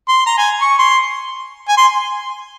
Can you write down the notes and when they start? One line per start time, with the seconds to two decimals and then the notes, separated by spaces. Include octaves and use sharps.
0.08 C6
0.26 A#5
0.38 G#5
0.61 C#6
0.79 C6
1.68 G#5
1.77 C6